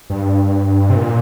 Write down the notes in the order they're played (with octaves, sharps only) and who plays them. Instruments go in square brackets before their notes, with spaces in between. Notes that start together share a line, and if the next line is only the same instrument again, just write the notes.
[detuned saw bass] G2
C3
A#2